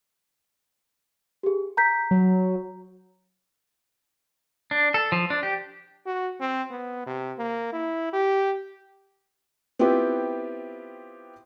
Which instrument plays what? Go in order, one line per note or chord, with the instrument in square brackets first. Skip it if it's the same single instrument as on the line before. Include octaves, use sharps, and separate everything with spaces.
[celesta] G4 G#4
A#5 G6 B6
[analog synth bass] F#3
[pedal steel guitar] D4
A4
F3
D4
G4
[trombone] F#4
C4
B3
C3
A#3
E4
G4
[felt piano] B3 C4 E4 F4 G4 B4